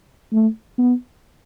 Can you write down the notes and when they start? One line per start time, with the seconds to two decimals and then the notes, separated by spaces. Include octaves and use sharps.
0.32 A3
0.78 B3